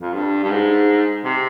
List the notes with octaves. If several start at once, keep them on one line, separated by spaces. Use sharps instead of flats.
F2
G2
G2
G#2
C3